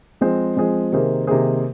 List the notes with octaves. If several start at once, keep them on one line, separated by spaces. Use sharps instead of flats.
F3 G#3 C4 G#4 C5
F3 G#3 C4 G#4 C5
C3 D#3 A#3 G#4 C5
C3 D#3 A#3 G#4 C5